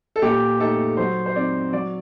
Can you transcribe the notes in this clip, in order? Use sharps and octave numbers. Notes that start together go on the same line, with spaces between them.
A4
A#2 G4
A3 D#4 A4
F#3 C5
C5
C4 D#4 D5
F#3 D5